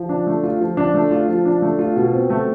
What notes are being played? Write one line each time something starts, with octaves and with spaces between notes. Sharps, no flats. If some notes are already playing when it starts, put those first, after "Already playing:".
Already playing: F3
D4
A3
F4
F3
D4
A3
F4
F3
D4
A3
F4
B2
C4
A3